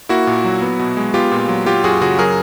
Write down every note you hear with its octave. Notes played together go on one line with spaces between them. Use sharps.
A#3 E4 F#4
A#2
F#3
B3
B2
G#3
B3 F4 G4
A#2
F#3
F#3 F4 G4
F#2 F#4 G#4
C#3 F#4 G#4
F#3 G#4 A#4